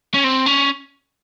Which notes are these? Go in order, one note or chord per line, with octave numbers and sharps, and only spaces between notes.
C#4
C4
C#4